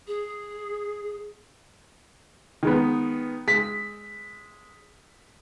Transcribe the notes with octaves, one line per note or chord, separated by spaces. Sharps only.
G#4
D#3 G#3 B3
G#3 B6